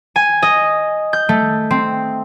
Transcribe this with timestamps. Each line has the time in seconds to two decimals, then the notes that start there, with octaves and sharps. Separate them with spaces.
0.16 G#5
0.42 D#5
1.13 G6
1.29 A3
1.71 C4